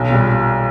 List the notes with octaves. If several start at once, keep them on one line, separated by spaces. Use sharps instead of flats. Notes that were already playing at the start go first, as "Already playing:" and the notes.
Already playing: B1
A#2 G3